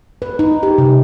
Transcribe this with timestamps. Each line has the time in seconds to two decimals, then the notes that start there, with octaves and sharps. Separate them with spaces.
0.22 B4
0.39 D#4
0.63 G4
0.78 C3